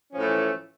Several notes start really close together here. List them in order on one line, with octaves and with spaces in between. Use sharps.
C#4 F3 A2 A3 E3